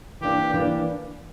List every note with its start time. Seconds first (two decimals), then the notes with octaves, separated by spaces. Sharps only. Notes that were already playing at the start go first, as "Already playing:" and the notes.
0.21 E3 A#3 D4 G4
0.54 E3 A#3 D4